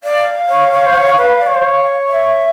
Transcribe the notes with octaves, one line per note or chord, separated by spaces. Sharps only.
D5 F5
C#5
C#5
C5
C#5
B4
D5
C#5
C5
C#5
E5